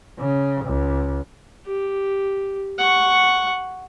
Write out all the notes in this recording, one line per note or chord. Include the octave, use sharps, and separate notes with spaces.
C#3
C#2
G4
F#5 C#6